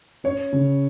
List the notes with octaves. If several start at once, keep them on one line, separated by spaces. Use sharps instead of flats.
C#4 C#5
C#3